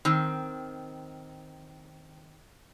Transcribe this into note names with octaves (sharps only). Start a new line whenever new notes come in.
D#3 C4